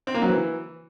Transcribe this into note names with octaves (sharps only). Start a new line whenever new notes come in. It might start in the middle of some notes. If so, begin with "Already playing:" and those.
C4
A#3
F#3
E3